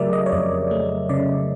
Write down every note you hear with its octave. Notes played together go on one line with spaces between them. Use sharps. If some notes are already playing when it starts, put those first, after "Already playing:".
Already playing: C#3 F#3 A3 G4 G#4 A#4 D5 E5
D#5
C#5
F2 D5
A3
C#3 D5